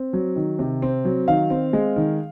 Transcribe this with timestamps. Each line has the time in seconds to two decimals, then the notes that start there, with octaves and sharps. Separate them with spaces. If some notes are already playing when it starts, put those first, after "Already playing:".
Already playing: C4
0.13 F#3
0.36 D#3
0.59 C3
0.82 C4
1.05 F#3
1.28 D#3 F5
1.50 C4
1.73 G#3
1.96 D#3